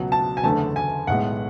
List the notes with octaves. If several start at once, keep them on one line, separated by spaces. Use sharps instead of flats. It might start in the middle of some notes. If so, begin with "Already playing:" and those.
Already playing: C#2 B2 F#3
A5
G#5
F#1 E2 D3 A3 A5
G#5
B1 A2 G#3 B3 F#5